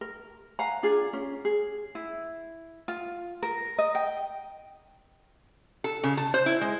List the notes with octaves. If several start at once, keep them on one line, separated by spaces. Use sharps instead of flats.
A#4
F5 F#5 G#5 A#5
D4 F4 G#4
C#4
G#4
E4
F4
A#4
D#5
G5
A4
C#3
A5
C5
E4
G#3